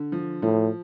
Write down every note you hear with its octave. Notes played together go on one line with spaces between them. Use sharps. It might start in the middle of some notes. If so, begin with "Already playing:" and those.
Already playing: D3
F3
A2 F3